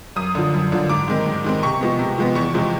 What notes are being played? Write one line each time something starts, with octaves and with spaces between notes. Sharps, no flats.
F#2 D#6
D3 F3
F#2
D3 F3
G#2 D6
D#3 G#3 C4
G#2
D#3 G#3 C4
C3 C#6
F3 G#3 B3
C3
F3 G#3 B3
E2 C#6
C3 F3 G#3 C4